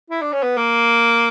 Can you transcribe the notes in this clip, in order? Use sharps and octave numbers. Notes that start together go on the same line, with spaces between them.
E4
D4
C#4
B3
A#3